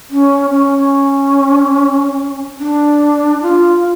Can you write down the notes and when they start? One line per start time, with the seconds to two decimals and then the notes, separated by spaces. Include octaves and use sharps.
0.10 C#4
0.51 C#4
2.59 D4
3.42 F4